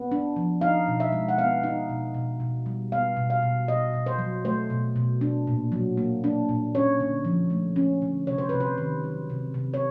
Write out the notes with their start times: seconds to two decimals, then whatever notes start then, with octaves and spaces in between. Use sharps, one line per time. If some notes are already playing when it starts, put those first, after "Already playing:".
Already playing: B3
0.11 D4
0.36 F3
0.61 D#4 F5
0.88 B2
1.00 E5
1.12 G#3
1.28 F#5
1.38 B3 F5
1.63 D#4
1.89 B2
2.14 B2
2.40 B2
2.66 G3
2.92 B3 F5
3.17 B2
3.30 F5
3.42 B2
3.68 B2 D#5
3.94 B2
4.06 C5
4.19 F#3
4.45 A3 C5
4.70 B2
4.96 B2
5.21 D4
5.47 A#2
5.72 F#3
5.97 A#3
6.24 D4
6.49 A#2
6.75 C#4 C#5
7.00 D3
7.25 F3
7.50 A3
7.76 C#4
8.02 D3
8.27 C3 C#5
8.38 C5
8.49 C3 B4
8.60 C5
8.78 D#3
9.04 F#3
9.30 C3
9.54 C3
9.74 C#5